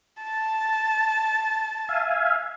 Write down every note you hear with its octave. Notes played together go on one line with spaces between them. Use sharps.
A5
E5 F5 G#5